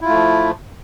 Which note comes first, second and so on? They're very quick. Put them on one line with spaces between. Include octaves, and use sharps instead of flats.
E4 F4 A3 F3